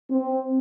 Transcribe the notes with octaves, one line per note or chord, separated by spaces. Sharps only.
C4